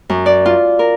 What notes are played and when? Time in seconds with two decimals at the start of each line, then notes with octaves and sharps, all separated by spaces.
0.10 F#2
0.26 D5
0.46 F4
0.79 A#4